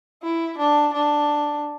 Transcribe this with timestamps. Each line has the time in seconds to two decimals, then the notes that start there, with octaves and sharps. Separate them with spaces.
0.23 E4
0.58 D4
0.93 D4